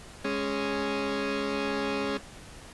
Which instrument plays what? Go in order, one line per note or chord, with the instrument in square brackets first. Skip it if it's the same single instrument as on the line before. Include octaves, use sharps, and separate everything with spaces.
[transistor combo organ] G#3 C#4